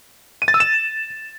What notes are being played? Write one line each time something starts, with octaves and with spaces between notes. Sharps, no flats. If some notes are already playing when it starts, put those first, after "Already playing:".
D#7
A6
E6
E7